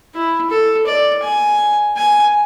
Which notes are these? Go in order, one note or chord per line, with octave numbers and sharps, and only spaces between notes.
E4
A4
D5
G#5
G#5